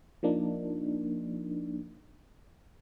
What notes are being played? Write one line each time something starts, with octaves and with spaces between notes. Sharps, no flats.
F3 A#3 D4 D#4